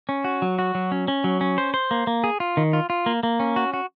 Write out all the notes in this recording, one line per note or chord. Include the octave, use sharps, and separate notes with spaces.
C#4
F#4
F#3
F#4
F#3
C#4
C#4
F#3
C#4
C5
C5
A#3
A#3
G#4
F4
D#3
F4
F4
A#3
A#3
C#4
F#4
F#4